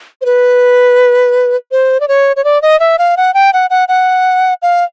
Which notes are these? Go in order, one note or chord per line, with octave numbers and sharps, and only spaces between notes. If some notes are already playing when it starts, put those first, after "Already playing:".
C5
B4
C5
D5
C#5
C#5
D5
D#5
E5
F5
F#5
G5
F#5
F#5
F#5
F5